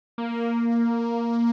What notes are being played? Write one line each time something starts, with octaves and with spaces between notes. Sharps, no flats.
A#3